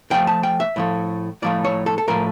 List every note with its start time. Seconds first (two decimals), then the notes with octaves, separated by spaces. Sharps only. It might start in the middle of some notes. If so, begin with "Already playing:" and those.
0.10 A2 F3 A3 G5
0.27 A5
0.43 G5
0.60 E5
0.76 A2 F3 A3
1.42 A2 F3 A3 D5
1.65 C#5
1.86 A4
1.98 A4
2.08 A2 F3 A3 A#4